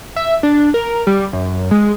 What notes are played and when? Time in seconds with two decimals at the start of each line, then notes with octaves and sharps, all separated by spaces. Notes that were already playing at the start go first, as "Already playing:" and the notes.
0.16 E5
0.43 D4
0.74 A#4
1.07 G3
1.33 F#2
1.71 G#3